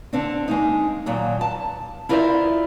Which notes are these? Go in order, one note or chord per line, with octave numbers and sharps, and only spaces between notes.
D3 C4 D4
G#3 A#3 D#4
D#2 A#2 F#3
A5
E4 F4 A#4 C5 D5 E5